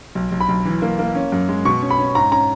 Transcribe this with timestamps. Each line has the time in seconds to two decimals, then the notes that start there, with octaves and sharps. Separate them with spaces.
0.15 B1
0.32 B1
0.40 B5
0.49 B1
0.65 E3
0.82 A#3
0.99 A#3
1.15 C#4
1.32 F#2
1.49 G#3
1.65 B2 C#6
1.82 C#4
1.90 B5
1.99 C#4
2.15 G#2 A#5
2.31 C#4 A#5